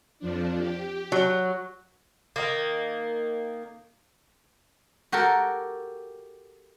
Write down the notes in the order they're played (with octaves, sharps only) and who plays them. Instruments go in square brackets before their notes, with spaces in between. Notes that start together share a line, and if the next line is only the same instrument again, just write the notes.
[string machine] F2 F3 D4
G4
[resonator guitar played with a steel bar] F#3
[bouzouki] D#3 A#3
[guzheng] F#4 G4 A4 A#4